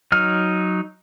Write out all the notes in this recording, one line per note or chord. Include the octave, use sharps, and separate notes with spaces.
F#3 D#4 F6